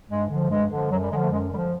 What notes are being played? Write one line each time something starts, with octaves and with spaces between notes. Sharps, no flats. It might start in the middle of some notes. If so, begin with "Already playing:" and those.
G2 G#3
D3 F3
G2 G#3
D3 F3
F#2 F#3
G3
D3 F3 G#3
A3
F#2 G#3
D3 F3 G3